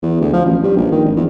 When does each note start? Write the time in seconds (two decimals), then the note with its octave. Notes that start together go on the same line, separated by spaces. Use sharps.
0.03 E2
0.21 D2
0.33 F3
0.45 A1
0.64 G2
0.77 A#1
0.92 D#3
1.05 G#1
1.16 E2